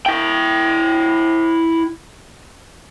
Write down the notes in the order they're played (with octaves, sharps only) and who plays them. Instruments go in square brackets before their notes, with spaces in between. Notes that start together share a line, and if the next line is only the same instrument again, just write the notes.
[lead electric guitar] E4 G5